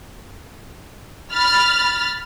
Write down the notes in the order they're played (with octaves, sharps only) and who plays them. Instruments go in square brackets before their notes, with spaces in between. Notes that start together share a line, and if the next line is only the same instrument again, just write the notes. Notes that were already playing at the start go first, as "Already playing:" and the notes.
[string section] B5 F6 A6